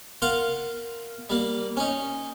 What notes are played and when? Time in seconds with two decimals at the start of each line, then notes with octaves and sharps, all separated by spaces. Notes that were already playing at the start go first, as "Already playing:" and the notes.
0.22 F4 A#4 F5 F#5
1.30 G3 A#3
1.77 C#4 D#4